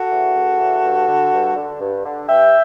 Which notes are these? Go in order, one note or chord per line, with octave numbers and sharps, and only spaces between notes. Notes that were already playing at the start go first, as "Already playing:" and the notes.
Already playing: F#4 A4
C#3 E3
C#2
C#3 E3
G2
D3
G2
D3
G2
D3
G2 E5 G5